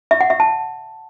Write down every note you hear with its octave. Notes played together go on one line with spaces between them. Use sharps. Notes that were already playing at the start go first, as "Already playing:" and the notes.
E5
F#5
E5
A5